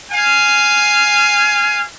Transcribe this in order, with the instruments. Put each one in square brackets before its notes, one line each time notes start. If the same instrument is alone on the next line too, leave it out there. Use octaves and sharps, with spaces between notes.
[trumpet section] F5 G#5